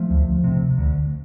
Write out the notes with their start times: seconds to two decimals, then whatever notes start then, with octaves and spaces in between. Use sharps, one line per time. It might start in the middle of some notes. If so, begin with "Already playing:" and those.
Already playing: F3 A3
0.10 D2
0.44 C3
0.78 D2